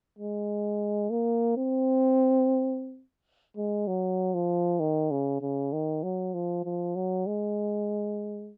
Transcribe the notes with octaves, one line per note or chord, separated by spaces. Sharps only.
G#3
A#3
C4
G#3
F#3
F3
D#3
C#3
C#3
D#3
F#3
F3
F3
F#3
G#3